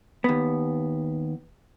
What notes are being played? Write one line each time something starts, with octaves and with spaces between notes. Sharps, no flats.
D#2 B3